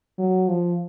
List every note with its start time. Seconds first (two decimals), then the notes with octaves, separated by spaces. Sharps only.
0.19 F#3
0.49 F3